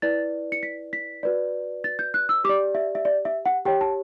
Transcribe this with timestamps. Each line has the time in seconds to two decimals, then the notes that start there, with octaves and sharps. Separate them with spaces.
0.02 E4 B4 D5 A6
0.52 C#7
0.63 B6
0.93 B6
1.23 F#4 B4 D5
1.84 A6
1.99 G6
2.14 F#6
2.29 E6
2.44 G4 D6
2.49 D5
2.75 E5
2.95 E5
3.05 D5
3.25 E5
3.46 F#5
3.65 G4 C#5 G5
3.81 A5